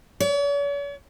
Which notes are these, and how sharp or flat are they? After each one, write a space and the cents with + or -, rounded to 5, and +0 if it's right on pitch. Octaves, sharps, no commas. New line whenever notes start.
C#5 +45